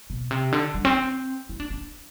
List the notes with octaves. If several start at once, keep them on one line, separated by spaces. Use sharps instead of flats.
B2
C3
D3
G3
C4
E4
D4
D4